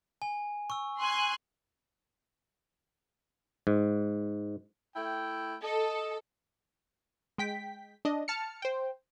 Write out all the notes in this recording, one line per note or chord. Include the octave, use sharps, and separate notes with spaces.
G#5
C#6 E6
G#5 C6 F#6
G#2
A3 E4 G5
A4 D#5
G#3 G5 B6
D4 D#5
A5 F6 C#7
C5 G5